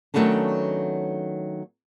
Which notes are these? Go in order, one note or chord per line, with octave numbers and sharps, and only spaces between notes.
D#3 F#3 A3 B3 C#4 D4